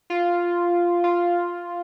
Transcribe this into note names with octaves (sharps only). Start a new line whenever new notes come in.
F4
F4